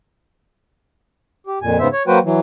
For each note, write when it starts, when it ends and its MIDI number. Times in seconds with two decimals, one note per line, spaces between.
1.47 1.59 67
1.62 1.78 41
1.62 1.78 46
1.62 1.78 80
1.79 1.88 44
1.79 1.88 49
1.79 1.88 59
1.79 1.88 72
1.79 1.88 76
1.93 2.03 73
2.07 2.19 54
2.07 2.19 58
2.07 2.19 66
2.07 2.19 71
2.07 2.19 72
2.07 2.19 79
2.24 2.40 52
2.24 2.40 54